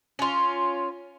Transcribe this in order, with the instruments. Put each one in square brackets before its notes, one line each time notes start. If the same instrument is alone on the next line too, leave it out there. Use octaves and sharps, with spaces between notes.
[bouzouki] C#4 F4